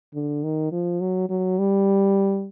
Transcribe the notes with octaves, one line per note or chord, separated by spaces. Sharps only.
D3
D#3
F3
F#3
F#3
G3